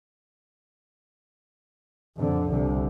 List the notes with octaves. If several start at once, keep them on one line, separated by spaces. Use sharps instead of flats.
F2 D3
C2 D3